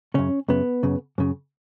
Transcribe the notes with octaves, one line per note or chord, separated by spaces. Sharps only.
F#2 C#3 C#4
F#2 C#3 B3
F#2 C#3
F#2 C#3